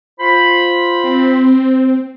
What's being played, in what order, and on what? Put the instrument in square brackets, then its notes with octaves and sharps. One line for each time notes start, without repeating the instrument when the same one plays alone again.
[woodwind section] F4 C5 B5
[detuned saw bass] C4